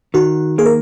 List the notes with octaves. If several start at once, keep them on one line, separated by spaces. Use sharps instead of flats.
D#3 F#4
A#3 G#4
A#4